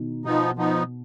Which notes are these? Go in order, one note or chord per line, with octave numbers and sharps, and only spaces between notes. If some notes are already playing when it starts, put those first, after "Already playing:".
Already playing: B2 D#3
B2 F3 B3 D#4
F3 B3 D#4